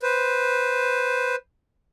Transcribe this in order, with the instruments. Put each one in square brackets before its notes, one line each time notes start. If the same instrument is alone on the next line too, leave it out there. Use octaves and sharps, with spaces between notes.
[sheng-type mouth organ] B4 C5